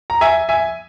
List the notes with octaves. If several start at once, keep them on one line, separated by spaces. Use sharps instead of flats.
A#5
E5 G#5
E5 G#5